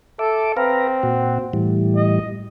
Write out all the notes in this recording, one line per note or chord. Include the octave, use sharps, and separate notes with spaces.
A4 E5 D6
C4 B4 F5 A#5
A#2 F#4
A2 E3 G3
D#5